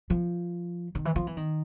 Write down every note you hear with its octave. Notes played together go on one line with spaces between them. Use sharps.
F3
D#3
E3
F3
E3
D#3